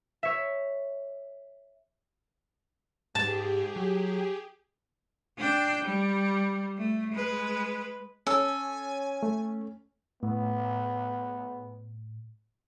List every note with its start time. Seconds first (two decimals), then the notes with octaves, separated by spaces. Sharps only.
0.23 C#5 E5
3.15 G#2 G#3 G4 G#4 A5
3.76 F#3
5.38 D4 G5
5.84 G3
6.78 A3
7.12 G#3 B4
8.27 C#4 A4 G#5
9.23 A3
10.23 A2 B3